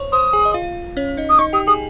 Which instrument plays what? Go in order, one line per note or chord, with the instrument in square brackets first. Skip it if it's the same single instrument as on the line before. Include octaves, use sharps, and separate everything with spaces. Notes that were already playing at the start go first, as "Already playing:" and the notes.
Already playing: [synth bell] C5 C#5 C#6
[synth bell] C5 C6 [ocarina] D#6
[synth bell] G#4 G#5
D#5
F4 F5
C#4 C#5
D#4 D#5
[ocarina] D#6
[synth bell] D#4 D#5 [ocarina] C#6
[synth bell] G4 G5 [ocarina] D#6
[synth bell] G#4 G#5 [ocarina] D#6